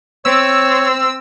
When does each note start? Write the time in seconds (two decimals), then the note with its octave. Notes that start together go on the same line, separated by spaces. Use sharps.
0.25 C4 C#5 E6